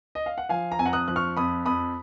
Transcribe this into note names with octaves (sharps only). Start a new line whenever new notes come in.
D#5
F5
F#5
F3 F5 G#5
A#5
F2 G#5
F#5 A#5
D#6 F#6
F3 F#6
C#6 F6
F2 B5 D#6
F2 B5 D#6